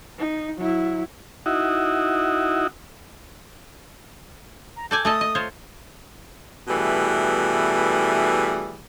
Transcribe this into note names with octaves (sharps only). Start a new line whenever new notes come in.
D#4
F#3 E4
D#4 E4 F#4
A#5
A4 D5 G#5 G6
A3 A4 D#5 D#6
D#5
F4 C5 C#5
B2 E3 G3 A3 G#4